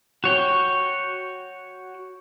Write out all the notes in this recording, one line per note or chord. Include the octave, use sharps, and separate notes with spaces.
F#4 C#5 G5